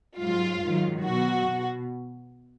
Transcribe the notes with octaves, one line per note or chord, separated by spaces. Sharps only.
G#2 F#3 F4
G#2 D#3 F#3
B2 F#3 F#4
B2